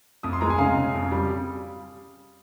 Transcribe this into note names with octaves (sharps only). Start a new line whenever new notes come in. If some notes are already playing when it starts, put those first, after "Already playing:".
F2 D#6
C6
G#3 A#5
G#5
C#3 F5
C#3
F2
G3